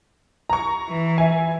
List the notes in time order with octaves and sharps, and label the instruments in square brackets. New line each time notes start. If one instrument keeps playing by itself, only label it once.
[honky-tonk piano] A#5 C#6
[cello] E3
[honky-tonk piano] E5 G#5